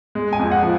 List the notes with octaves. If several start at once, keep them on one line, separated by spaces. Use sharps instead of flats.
G#3
G#5
F2
F#5
F3